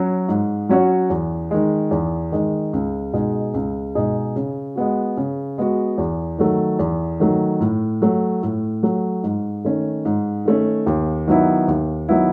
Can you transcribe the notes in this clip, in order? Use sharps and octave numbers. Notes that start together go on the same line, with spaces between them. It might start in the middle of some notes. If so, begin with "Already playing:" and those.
Already playing: F#3 C#4 F#4 C#5
G#2
F#3 C#4 F#4 C#5
E2
D#3 G#3
E2
D#3 G#3
C#2
B2 G#3 D#4 G#4
C#2
B2 G#3 D#4 G#4
C#3
G#3 B3 F#4
C#3
G#3 B3 F#4
E2
D#3 F#3 A3
E2
D#3 F#3 A3
A2
F#3 A3
A2
F#3 A3
G#2
D#3 A3 C#4
G#2
D#3 A3 C#4
D#2
D#3 F#3 B3 E4
D#2
D#3 F#3 B3 E4